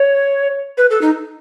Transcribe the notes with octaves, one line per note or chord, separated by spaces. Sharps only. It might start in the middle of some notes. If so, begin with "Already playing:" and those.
Already playing: C#5
B4
A4
D#4